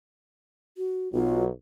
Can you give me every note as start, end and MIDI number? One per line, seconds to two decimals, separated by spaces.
0.77 1.11 66
1.13 1.49 35
1.13 1.49 54
1.13 1.44 65